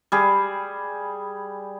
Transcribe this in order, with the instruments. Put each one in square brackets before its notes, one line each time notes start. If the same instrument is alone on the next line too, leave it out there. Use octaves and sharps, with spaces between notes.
[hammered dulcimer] G3 G#4